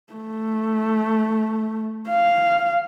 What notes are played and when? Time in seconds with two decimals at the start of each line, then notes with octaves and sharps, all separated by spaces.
0.13 A3
2.10 F5